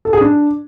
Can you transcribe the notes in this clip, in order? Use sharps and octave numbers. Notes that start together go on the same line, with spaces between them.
A4
G#4
D4